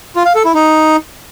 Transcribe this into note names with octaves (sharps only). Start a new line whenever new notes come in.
F4
F5
A4
E4
D#4